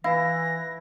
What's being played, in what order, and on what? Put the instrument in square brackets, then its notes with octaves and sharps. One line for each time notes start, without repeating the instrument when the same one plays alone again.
[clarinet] E3 [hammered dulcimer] E4 [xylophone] F5 [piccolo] A#6